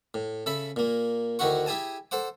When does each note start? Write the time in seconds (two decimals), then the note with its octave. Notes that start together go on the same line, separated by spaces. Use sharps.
0.14 A2
0.46 C#3 A4 E5 B5
0.76 A#2 A#3
1.39 D2 D#3 E4 F#4 F#5 C#6
1.66 E4 G4 G#4 G#5 A5
2.11 A4 C5 F#5 D6